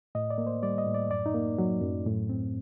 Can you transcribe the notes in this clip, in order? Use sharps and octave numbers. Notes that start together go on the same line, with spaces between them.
A2 D#5
D5
A#3
C5
G3 D5
D#5
A2
D5
F#2 D5
D#4
A#3
F#3
F#2
A2
C4